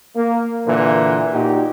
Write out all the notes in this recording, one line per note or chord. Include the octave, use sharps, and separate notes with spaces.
A#3
A#2 D3 E3
A#2 D#4 F#4 G4